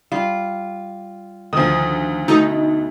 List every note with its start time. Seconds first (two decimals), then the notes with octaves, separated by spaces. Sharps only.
0.12 G3 F4
1.53 D2 D#3 F3 D#6
2.28 B2 A3 D#4 A4